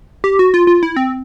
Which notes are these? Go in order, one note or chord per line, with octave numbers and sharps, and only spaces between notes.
G4
F#4
F4
F4
E4
C4